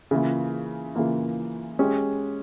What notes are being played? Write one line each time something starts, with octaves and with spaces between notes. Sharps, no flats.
C#3 E3 A#3 F4
C#3 E3 A#3 F4
G#3 C#4 G4